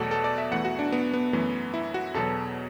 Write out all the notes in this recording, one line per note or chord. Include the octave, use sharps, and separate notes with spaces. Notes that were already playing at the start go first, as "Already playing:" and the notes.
Already playing: E2 B2 F#3 A3 F#4 A4 D5
A4
D5
E5
E2 E3 A3 F#5
F#4
D4
B3
B3
F#2 E3 A3
E4
F#4
E2 B2 F#3 A4